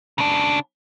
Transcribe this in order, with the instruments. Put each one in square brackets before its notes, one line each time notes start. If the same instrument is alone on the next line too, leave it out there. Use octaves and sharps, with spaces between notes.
[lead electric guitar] C#3 D4